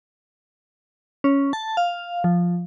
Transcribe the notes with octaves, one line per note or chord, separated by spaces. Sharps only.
C#4
A5
F5
F3